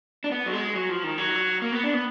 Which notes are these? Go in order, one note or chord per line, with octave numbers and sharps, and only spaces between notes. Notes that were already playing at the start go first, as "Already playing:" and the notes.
D4
B3
F#3
G#3
F#3
F3
D#3
F#3
A#3
B3
D4
B3